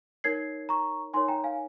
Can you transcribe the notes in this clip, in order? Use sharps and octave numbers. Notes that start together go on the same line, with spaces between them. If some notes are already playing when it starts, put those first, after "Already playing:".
D#4 A#4 C#5 G#6 C7
A#5 C#6
D#4 A#4 C#5 G#5 C6
G5 A#5
F5 G#5